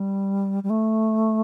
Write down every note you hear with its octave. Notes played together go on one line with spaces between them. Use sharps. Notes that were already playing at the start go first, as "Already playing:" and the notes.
Already playing: G3
G3
A3